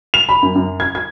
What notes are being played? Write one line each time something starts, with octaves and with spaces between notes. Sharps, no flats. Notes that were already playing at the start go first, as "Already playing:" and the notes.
F7
B5
F#2
F#2
G#6
G#6